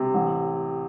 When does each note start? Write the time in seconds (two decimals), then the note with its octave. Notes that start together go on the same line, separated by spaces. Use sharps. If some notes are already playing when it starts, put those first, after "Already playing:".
Already playing: C3
0.14 A1